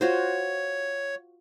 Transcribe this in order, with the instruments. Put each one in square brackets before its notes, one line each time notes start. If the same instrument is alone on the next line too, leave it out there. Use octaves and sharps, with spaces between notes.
[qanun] F4 F#4 C5 [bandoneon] C#5